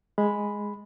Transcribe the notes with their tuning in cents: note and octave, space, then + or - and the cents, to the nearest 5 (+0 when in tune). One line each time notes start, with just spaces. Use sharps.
G#3 +0 B5 +0